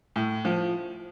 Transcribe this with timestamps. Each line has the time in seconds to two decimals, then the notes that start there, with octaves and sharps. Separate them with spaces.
0.16 A2
0.45 F3